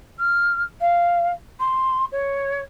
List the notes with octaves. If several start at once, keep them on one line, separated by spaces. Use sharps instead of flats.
F6
F5
C6
C#5